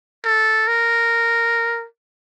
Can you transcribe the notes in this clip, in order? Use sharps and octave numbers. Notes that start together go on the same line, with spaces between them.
A4
A#4